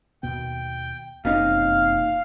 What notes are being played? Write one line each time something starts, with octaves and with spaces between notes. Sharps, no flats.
D#2 B2 B3 G5
E1 F2 A#2 C4 C#4 D#4 F5